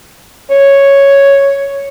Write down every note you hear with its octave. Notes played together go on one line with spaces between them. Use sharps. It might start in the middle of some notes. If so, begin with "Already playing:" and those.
C#5